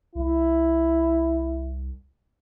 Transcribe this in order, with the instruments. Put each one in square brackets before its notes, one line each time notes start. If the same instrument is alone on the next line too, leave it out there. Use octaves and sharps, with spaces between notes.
[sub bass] C2 [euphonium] E4